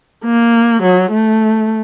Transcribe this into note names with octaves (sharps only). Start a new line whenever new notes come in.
A#3
F#3
A3